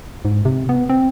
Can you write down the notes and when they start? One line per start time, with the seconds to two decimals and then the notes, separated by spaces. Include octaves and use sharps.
0.25 G#2
0.45 C3
0.69 B3
0.89 C4